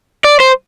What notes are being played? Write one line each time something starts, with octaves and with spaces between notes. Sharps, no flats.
D5
C5